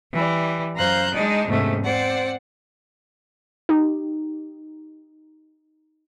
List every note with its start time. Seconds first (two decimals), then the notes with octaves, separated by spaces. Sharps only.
0.12 E3 G3
0.76 F#2 C5 F5 A#5 F#6 G6
1.13 G#3 D4 D#4 D5
1.47 E2 G#2 C3 A3 C#4
1.84 C4 C5 D5 F#5
3.69 D#4 G4